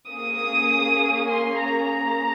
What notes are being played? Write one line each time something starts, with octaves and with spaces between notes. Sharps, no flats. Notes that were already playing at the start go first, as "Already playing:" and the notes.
A#3 C#4 G#4 D#6
C6
A#5
A#5